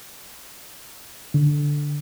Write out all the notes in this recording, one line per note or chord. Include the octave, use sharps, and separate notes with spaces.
D3